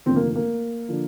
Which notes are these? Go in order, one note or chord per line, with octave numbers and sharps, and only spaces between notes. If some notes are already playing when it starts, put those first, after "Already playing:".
F1 D#2 D3 F3 C4
A#3
A#3
D3 F3